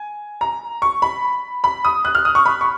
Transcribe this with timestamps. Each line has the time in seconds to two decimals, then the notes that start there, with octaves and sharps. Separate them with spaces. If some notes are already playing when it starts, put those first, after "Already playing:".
Already playing: G#5
0.41 A#5
0.82 C#6
1.02 B5
1.64 B5
1.85 D#6
2.05 F#6
2.15 F6
2.25 D#6
2.35 C#6
2.46 B5
2.61 C#6